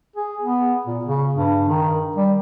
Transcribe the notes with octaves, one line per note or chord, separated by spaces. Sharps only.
G#4
B3
A#2
C#3
G2
D#3
G3